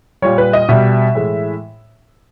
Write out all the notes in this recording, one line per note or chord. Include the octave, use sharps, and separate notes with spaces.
A#2 G3 C#5
B4
D#5
B2 G3 E5
A2 E3 G#3